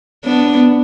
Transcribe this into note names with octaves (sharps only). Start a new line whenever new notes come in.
B3 D4